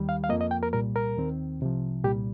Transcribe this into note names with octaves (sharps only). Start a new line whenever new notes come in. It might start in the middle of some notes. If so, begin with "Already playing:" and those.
Already playing: D#2 D#3 G3
F5
F5
F2 F3 A#3 D#5
D#5
G5
A#4
C2 A#2 G3 A#4
A#4
D#2 D#3 C4
C2 C3 F3
C2 A#2 G3 G4